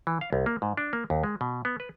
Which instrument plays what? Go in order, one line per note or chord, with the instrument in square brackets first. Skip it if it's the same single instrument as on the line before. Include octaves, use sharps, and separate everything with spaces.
[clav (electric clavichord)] E3
F5
C2
A#3
G#2
D4
A#3
D#2
G#3
B2
B3
B4